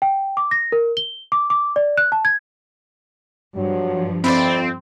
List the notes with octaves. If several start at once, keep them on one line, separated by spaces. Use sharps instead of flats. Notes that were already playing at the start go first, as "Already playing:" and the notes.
G5
D6
A#6
A#4
G7
D6
D6
D5
F#6
A5
G#6
G2 F3 F#3
F2 C4 E4 F4 D5